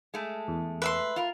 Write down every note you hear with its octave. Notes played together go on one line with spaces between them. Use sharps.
G#3 A3
E2
B4 E5 C6
F4 A#4